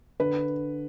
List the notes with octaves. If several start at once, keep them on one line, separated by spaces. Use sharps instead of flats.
D3 B4